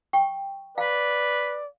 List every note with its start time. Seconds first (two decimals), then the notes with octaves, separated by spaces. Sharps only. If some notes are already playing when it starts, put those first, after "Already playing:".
0.13 G5 C#6
0.78 B4 D5 F5